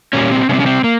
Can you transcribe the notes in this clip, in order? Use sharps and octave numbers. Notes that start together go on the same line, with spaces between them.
A#2 G3 A#3 C#4
C4
C3 G3 C4 C#4
C#4
C4
A#3